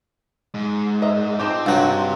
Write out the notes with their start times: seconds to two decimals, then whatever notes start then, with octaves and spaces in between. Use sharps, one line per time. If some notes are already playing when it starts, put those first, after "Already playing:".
0.54 G#2
1.02 A#4 D#5 E5
1.39 F3 C4 D#4 G4
1.66 G2 C3 F#3